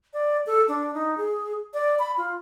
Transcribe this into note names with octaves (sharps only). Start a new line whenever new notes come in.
D5
A4
D4
D#4
G#4
D5
B5
F4